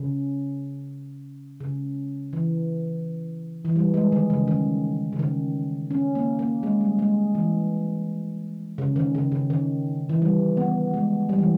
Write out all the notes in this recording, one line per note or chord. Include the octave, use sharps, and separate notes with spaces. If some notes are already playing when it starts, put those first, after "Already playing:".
Already playing: C#3
C#3
E3
E3
G3
G#3
D#3
C#3
D#3
C#3
D#3
C#4
A#3
A#3
G#3
G3
G#3
E3
C#3
D#3
C#3
C#3
D#3
E3
G3
B3
G#3
G3
E3